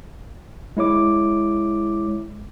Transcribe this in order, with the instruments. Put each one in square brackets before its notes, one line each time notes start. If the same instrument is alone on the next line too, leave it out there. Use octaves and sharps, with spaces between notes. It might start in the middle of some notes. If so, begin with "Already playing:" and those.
[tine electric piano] G#3 E4 C#5 D6